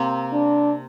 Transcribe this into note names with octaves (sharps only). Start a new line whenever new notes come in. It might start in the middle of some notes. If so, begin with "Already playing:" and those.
Already playing: C3 A#3 C4
D4